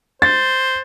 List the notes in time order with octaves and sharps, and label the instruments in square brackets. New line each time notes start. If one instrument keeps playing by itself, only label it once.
[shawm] C5 [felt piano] A6